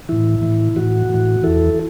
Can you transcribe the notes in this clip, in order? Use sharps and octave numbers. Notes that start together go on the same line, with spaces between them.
A2 E3 E4
A2 E3
A2 E3 F#4
A2 E3
E2 E3 E4 A4